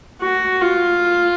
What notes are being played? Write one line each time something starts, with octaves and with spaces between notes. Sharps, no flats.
F#4
F4